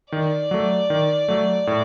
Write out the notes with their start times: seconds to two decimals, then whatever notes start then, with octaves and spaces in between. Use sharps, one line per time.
0.12 D#3 D5
0.51 F#3 A3
0.90 D#3
1.28 F#3 A3
1.67 A2